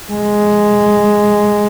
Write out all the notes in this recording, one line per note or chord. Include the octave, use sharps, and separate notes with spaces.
G#3